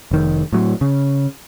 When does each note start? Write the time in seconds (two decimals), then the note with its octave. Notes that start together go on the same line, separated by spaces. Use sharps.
0.11 F1 D#3
0.53 A2 F#3
0.81 C#3